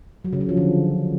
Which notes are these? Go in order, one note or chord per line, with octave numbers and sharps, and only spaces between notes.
F#3
C#3
F#3
F3
D3